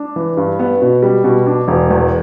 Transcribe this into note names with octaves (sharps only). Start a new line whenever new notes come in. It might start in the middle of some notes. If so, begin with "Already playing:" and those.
Already playing: D4
E3
G2
B3
B2
G3
B2
D4
E1
E2